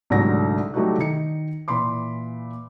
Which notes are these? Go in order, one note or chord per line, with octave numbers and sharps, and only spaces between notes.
C2 G#2 D3 F#3 A3 A#6
F#3 G3 A3 D#4 E4 F#4
D#3 D#4 C#7
A#2 E3 B5 C6 D6